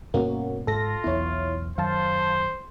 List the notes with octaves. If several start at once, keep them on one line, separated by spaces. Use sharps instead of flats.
G2 B2 A#3 B3 C#4 F#4
G#2 F4 A4 A#6
B1 E2 B3 E4 C#5
F#2 D#3 F#3 C5 F5 A5